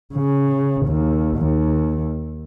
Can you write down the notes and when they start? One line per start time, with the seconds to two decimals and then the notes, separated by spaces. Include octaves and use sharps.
0.14 C#3
0.87 D#2
1.37 D#2